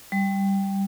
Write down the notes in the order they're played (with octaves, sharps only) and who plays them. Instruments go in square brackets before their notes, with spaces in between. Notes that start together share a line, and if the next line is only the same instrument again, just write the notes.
[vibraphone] G3